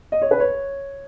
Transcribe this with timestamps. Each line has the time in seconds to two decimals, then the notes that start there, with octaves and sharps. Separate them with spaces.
0.12 D#5
0.22 C#5
0.31 B4
0.40 C#5